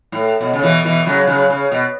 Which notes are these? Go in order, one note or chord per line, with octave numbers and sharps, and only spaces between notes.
A2
B2
C#3
B2 E3
B2 E3
C#3 F#3
C#3 F#3
C#3
B2